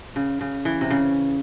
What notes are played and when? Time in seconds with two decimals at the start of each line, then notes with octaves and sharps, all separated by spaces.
0.16 C#3
0.41 C#3
0.65 E3
0.81 C3
0.90 C#3